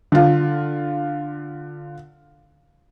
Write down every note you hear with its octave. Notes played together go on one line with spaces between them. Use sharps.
D3 F4